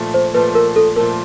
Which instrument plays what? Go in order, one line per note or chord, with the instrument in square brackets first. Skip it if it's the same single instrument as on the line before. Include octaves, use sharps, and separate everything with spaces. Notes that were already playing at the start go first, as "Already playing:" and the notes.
Already playing: [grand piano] A#2 F3 A3
[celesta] C5
[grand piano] A#2 F3 A3 [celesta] B4
[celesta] A#4
A4
[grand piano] A#2 F3 A3 [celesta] A#4